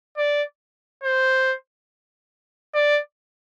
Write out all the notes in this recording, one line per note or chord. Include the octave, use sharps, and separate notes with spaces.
D5
C5
D5